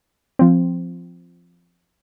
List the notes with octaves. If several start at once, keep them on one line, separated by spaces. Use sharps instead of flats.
F3 C4